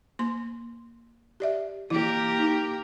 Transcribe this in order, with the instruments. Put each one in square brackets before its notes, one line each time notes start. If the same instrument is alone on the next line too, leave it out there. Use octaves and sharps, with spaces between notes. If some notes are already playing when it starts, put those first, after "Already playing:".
[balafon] A#3 C6
G4 D5 E5
[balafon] E3 E4 [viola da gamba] A#3 G4 A#4
[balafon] D#4